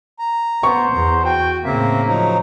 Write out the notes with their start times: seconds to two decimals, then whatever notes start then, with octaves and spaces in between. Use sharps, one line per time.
0.19 A#5
0.63 B3 C5 C#6
0.93 E2 A#5
1.25 F#4 G5
1.65 A2 C#3 A#3 C4 E5
2.07 F3 F#3 D#4